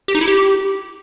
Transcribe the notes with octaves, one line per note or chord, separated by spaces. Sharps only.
G4
D#4
E4
G4